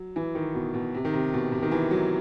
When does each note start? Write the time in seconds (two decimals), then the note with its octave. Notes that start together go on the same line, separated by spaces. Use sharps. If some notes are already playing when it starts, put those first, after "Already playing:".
Already playing: F#3
0.16 E3
0.35 D#3
0.55 B2
0.74 B2
0.94 C3
1.05 D#3
1.14 C3
1.33 B2
1.52 C3
1.62 D#3
1.71 E3
1.91 F#3